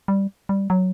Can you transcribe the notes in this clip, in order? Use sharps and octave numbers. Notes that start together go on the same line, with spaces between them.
G3
G3
F#3